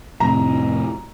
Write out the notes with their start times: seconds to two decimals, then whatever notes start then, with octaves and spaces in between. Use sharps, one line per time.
0.20 F2 A2 C3 A#5